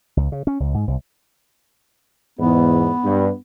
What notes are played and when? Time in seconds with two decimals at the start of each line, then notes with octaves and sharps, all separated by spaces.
0.17 C#2
0.32 C#3
0.47 C#4
0.60 C#2
0.74 G#2
0.87 C2
2.39 E2 G#2 B3
3.04 G2